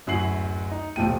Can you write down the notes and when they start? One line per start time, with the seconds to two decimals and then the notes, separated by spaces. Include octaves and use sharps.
0.07 D1 F#2 E4 F#4 C7 F#7
0.71 D#4
0.96 D#1 B1 F3 A3 G5 D#7